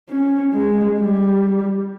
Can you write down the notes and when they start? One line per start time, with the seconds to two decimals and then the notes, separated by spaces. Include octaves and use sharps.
0.09 C#4
0.53 G#3
0.99 G3